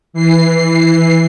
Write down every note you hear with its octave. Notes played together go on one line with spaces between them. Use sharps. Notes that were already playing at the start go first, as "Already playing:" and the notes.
E3 C7